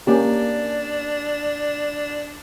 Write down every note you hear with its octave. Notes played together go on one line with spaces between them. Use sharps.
A#3 C#4 D4 G4